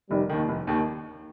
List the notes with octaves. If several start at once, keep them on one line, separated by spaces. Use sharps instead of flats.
F1 D#3 G3
D#2 D#3
F1
D#2 D#3